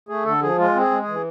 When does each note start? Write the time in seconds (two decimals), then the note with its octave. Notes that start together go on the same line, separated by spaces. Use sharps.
0.09 A3 G#4
0.25 D3 A4
0.42 F3 G#4
0.58 G#3 F4
0.75 C4
0.80 G#4
0.91 G#3
1.02 G#4
1.08 E3